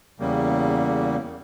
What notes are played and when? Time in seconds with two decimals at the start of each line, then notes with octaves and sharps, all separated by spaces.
0.20 E2 C#3 G3 A#3